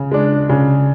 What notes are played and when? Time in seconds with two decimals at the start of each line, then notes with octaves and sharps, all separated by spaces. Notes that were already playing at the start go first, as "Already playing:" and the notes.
Already playing: C#3
0.12 G#3 D4
0.49 C#3